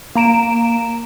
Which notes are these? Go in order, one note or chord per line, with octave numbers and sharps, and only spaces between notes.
A#3 A#5 D7 E7